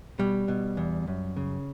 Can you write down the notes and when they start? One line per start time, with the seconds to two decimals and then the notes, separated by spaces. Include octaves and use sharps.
0.19 B2 G3
0.48 B2
0.77 E2
1.08 F#2
1.36 C#3